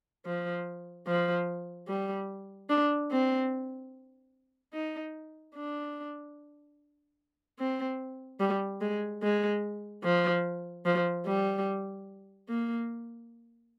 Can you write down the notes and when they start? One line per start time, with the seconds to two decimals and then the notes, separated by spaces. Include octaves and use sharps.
0.26 F3
1.07 F3
1.88 G3
2.70 D4
3.11 C4
4.74 D#4
5.55 D4
7.59 C4
8.40 G3
8.81 G#3
9.23 G#3
10.04 F3
10.86 F3
11.26 G3
12.49 A#3